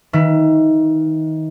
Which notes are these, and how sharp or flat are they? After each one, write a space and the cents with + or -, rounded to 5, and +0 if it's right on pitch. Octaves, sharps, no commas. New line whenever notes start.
D#3 +20 B4 -10 E5 +25